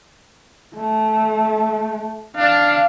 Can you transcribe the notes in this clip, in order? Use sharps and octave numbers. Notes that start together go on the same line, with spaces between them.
A3
D4 F5